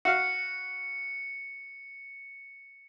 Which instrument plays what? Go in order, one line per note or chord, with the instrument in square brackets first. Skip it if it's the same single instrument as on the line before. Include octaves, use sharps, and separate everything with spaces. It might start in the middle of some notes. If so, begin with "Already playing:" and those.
[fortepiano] F#4 F5 [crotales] C#7